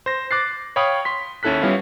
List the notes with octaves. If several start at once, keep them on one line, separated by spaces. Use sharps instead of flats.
C5 A#6
D6 F#6 A6 C7
C#5 F5 G5 B5 D#6
C6 B6
D#2 C#4 E4 A4 F#6 B6
G3 B3 C#4 E4 F4